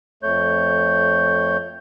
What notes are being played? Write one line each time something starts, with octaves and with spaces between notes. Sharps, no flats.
F2 A3 C#5 G6